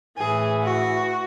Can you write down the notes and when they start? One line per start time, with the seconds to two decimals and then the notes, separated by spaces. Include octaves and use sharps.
0.17 A2 E3 G#4
0.62 F#4